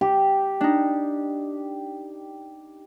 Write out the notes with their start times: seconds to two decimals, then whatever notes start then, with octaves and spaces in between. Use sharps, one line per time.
0.01 G4
0.61 D4 D#4